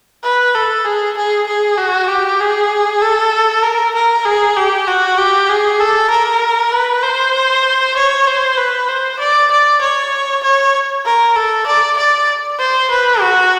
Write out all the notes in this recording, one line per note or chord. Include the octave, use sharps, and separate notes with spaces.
B4
A4
G#4
G#4
G#4
F#4
G4
G#4
A4
A#4
A#4
G#4
G4
F#4
G4
G#4
A4
A#4
B4
C5
C#5
C5
B4
C5
D5
D5
C#5
C#5
A#4
A4
D5
D5
C5
B4
F#4